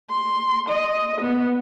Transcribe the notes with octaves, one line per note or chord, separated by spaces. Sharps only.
C6
D#5
B3